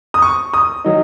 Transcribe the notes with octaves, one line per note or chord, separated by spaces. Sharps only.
D#6
C#6
D#6
D#3 F#3 D#4